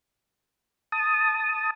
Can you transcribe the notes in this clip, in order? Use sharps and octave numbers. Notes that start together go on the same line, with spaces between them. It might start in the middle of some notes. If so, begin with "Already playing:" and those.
A5 D#6